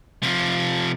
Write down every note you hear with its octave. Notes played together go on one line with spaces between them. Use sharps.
C3 F3